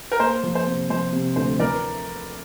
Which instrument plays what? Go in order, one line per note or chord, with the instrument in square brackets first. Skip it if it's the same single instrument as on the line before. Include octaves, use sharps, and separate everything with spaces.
[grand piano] A#4
[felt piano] A#3 [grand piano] C5
[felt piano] F3
[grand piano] C5
[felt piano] C3
[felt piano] F3 [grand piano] C5
[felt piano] C3
[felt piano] D2 [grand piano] C5
[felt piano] E3 [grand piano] A#4 D5